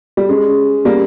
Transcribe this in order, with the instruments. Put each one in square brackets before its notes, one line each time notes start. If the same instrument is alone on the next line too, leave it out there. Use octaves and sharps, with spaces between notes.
[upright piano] G3
[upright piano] G#3 [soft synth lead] C#4
[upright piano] G3 A#3